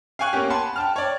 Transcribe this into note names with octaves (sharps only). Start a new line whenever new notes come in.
F5 G5 G#5 C#6 F#6
A#3 B3 C#4 G4
F#5 G#5 A5 B5 C6
G5 A5 F6
C#5 D5